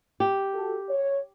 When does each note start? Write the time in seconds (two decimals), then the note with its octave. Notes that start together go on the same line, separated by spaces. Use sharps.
0.20 G4
0.53 F#4 A4
0.88 C#5